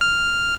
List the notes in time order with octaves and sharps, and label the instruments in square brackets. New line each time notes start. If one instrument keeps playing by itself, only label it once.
[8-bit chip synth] F6